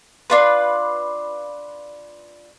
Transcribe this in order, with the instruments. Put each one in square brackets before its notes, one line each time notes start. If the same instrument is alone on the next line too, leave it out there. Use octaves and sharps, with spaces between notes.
[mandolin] D4 F4 B4